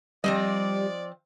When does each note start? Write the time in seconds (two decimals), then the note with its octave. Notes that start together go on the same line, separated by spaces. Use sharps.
0.24 F3 G3 C4 D5 D#5